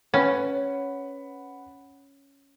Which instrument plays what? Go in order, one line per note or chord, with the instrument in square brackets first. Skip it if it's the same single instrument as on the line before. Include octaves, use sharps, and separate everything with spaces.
[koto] C#4 [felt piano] B4 F#5 B5